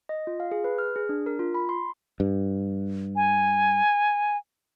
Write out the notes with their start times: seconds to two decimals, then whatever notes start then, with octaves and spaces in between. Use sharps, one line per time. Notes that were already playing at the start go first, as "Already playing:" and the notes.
0.09 D#5
0.27 F4
0.40 F5
0.51 G#4
0.64 B4
0.78 F6
0.96 G#4
1.09 D4
1.26 A#4
1.39 F4
1.54 B5
1.69 C6
2.20 G2
3.16 G#5